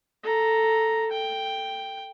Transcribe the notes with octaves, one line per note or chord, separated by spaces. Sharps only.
A4 A#5
G5